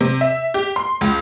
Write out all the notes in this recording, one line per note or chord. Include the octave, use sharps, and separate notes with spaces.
C3
E5
G4
C6
C#2